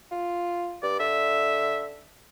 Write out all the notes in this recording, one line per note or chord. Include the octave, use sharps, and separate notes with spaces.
F4
G2 D5
D3 E5